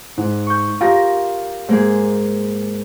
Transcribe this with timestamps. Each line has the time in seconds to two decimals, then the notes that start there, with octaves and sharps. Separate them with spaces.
0.17 G#2
0.47 C#6 G6
0.81 F4 G4 A#4 A#6
1.68 G#2 A#3 G#4